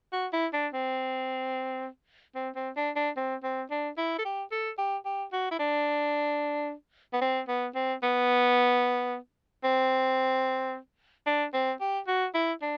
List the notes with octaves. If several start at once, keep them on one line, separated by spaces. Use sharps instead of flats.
F#4
E4
D4
C4
C4
C4
D4
D4
C4
C4
D4
E4
A4
G4
A4
G4
G4
F#4
E4
D4
B3
C4
B3
C4
B3
C4
D4
C4
G4
F#4
E4
D4